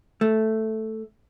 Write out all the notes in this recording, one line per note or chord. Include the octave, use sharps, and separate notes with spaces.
A3